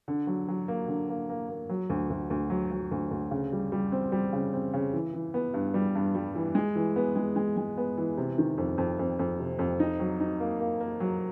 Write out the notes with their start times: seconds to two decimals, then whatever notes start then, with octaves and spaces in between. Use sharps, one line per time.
0.08 D3
0.27 F#3
0.48 F#3
0.68 A#3
0.88 D3
1.09 A#3
1.29 A#3
1.49 A#3
1.69 F#3
1.90 D2
2.10 D2
2.30 D2
2.50 F#3
2.71 F#3
2.91 D2
3.11 D2
3.31 C#3
3.52 G3
3.72 G3
3.92 C4
4.12 G3
4.33 C#3
4.54 C4
4.74 C#3
4.93 E3
5.13 E3
5.34 B3
5.54 G2
5.74 G3
5.95 G2
6.15 G3
6.35 E3
6.55 G#3
6.75 E3
6.96 B3
7.16 G#3
7.36 G#3
7.57 G#3
7.78 B3
7.97 E3
8.17 C3
8.38 D#3
8.58 F2
8.78 F2
8.99 F2
9.19 F2
9.39 C3
9.59 F2
9.80 D#4
10.00 F#3
10.20 D#4
10.40 A#3
10.60 A#3
10.80 A#3
11.00 F#3